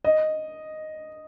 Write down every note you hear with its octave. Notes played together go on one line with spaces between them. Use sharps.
D#5